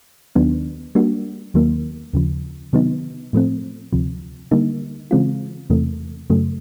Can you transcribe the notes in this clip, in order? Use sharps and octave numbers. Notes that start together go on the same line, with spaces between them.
D#2 D#3 F#3 B3 D4
G3 A#3 D4 F#4
D#2 D#3 F#3 A#3
D#2 C#3 F3
C3 D#3 F#3 B3 D#4
A2 F3 A3 C4
D2 C3 F3
D3 G3 A#3 D#4
C#3 E3 G#3 C4 F4
E2 C3 E3 A3
F#2 C#3 F#3 A3